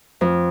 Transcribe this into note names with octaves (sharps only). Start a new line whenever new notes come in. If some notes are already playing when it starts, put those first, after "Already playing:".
F2